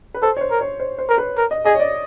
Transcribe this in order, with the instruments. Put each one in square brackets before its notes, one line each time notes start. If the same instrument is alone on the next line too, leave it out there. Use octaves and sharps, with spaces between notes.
[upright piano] B4
[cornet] A4 [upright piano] C5
[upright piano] C#5
C5
[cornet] A#4
[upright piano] C#5
C5
C5
[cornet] A#4
[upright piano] B4
[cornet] A#4
[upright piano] D#5
[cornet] G#4 [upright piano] D#5
[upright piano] C#5
D5